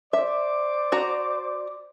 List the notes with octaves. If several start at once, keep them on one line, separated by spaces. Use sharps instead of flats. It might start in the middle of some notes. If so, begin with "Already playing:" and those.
C5 D5 E5 D6
F#4 A#5